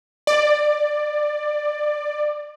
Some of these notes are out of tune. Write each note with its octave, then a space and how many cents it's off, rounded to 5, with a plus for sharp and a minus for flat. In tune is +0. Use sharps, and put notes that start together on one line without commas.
D5 +15